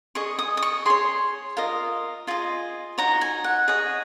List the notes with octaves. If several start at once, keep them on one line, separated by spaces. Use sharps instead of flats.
G#4 D#5 C#6
D#6
D#6
C#6
G#4 C#5 C6
F4 A#4 D#5
F4 G#4 D#5
D#4 F#4 C#5 A#5
G#5
F#5
G#4 C#5 D#5